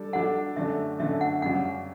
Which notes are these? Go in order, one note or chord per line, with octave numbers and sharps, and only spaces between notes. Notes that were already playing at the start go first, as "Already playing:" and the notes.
Already playing: G3 D4 A4 D5
G3 D4 A4 D5 F#5
F#2 D3 A3 D4 E5
F#2 D3 A3 D4 E5
F#5
F#2 C#3 G3 F#5